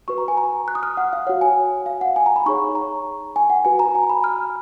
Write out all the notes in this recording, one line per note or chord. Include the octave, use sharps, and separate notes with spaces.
F#4 B4 C#6
A#5
G#5
A#5
F#6
D#6
F6
F#5
F5
F#4 C#5 F#5
G#5
F5
F#5
G#5
A#5
B5
D#4 G#4 C#5 C#6
A#5
G#5
F#5
F#4 B4 G#5
A#5
G#5
A#5
B5
F6